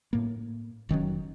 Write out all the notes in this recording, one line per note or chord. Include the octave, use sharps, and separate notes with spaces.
A2 A#3
F1 D#3 F#3 C#4